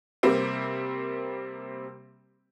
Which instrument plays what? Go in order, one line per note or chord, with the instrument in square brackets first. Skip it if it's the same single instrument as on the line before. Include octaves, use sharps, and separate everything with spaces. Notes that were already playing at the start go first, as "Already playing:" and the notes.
[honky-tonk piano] C3 G3 A#3 C4